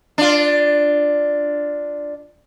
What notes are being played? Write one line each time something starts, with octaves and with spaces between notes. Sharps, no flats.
D4 F4